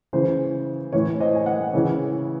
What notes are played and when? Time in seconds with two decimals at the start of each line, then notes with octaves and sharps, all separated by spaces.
0.13 C#3 E3 C5
0.92 A2 E3 C#5
1.20 C5 D#5
1.35 G#5
1.46 D#5 F#5
1.73 C#3 E3 C#5